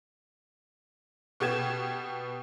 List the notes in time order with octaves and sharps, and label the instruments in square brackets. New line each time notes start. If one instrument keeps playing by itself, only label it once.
[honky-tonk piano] B2 B3 G4 G#6 E7